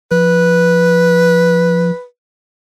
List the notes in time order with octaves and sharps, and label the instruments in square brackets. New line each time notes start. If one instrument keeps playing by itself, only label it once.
[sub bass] F3 [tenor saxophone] B4